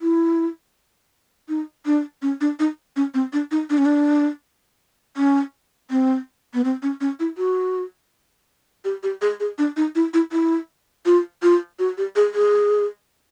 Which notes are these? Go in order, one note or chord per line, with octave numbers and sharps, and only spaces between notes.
E4
D#4
D4
C#4
D4
D#4
C#4
C4
D4
D#4
D4
C#4
D4
C#4
C4
B3
C4
C#4
C#4
E4
F#4
G4
G4
G#4
G#4
D4
D#4
E4
E4
E4
F4
F4
F#4
G4
G#4
G#4